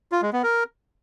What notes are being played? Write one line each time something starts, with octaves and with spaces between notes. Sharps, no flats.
F4
G#3
B3
A#4